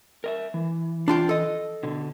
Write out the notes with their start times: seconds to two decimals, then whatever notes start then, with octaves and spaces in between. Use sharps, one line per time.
0.24 A#4 D#5 E5
0.54 E3
1.08 D4 F4 G5
1.29 A4 D#5
1.83 B2 D3